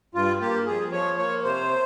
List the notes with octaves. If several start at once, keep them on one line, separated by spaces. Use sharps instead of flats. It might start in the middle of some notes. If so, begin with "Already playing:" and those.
G2 F4
A#3 G4
F2 G#4
F3 C#5
A#3 C#5
C3 C5